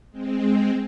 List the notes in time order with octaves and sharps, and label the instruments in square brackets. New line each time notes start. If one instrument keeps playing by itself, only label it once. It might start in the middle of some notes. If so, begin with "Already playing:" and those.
[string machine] G#3 C4